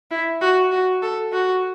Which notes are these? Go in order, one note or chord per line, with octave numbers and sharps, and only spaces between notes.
E4
F#4
F#4
A4
F#4